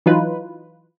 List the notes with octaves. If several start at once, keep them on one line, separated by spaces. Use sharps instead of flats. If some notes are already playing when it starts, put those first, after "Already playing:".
E3 F#3 D#4 F4 B4